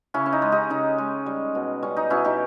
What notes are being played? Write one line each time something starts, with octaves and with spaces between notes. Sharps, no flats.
C#3 C#4 E4
C#4
D#4
G#3
D#4 G4
C#3 D#4
G#3
G3
B2
G3 C#4
D#4
B2 C#4 E4
D#4 G4